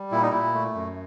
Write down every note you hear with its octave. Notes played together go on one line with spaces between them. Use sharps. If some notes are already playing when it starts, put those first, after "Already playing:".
Already playing: G3
A#2 E4
D#4
A#2 E4
A3
F#2